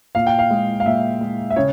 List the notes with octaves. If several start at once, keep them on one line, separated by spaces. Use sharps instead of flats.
A#2 F5
G5
F5
G#3
F5
A#2 E5
G#3
E5
C#3 C#5